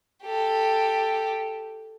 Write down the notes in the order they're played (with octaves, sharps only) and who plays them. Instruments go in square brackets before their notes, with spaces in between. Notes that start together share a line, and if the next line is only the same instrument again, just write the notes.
[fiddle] G4 A4